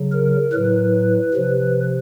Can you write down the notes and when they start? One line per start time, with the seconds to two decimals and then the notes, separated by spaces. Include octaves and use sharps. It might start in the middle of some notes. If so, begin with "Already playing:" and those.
Already playing: C#3 F#3
0.12 A#4
0.53 A2 F#3 B4
1.34 C3 F3